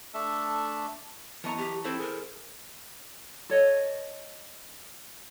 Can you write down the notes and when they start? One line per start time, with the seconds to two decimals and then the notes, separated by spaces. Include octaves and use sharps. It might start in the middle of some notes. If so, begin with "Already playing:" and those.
0.14 A3 D4 A4 E5
1.44 F#2 E3 B3 D#5 A5 A#5 C#6
1.58 G4
1.84 C4 E4 A4 C5
1.99 G#4 A#4
3.50 A4 C#5 D#5